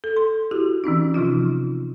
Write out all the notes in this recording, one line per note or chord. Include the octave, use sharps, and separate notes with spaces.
A4
C6
E4 F#4 G4
E3 C4 C#4 D#4
C3 F3 D#4 F4